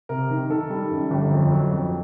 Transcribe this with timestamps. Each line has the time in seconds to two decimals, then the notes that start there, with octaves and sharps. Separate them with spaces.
0.09 C3 A#4
0.30 D#3
0.50 D#3 A4
0.70 G3
0.91 F#2
1.11 G1
1.31 F2
1.52 F#3
1.71 F2